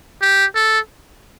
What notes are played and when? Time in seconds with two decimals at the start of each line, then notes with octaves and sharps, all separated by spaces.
0.22 G4
0.55 A4